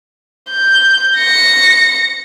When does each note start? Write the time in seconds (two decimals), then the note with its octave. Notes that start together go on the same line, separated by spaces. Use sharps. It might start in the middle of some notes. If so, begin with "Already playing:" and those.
0.51 G6
1.17 A#6 C#7